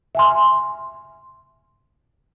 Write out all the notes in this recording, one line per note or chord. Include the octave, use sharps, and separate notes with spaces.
E5 G#5 C6